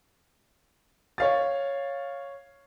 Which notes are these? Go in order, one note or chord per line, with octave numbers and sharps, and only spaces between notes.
C#5 F5 A6